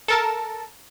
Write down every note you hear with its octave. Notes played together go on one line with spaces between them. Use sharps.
A4 A#4 A5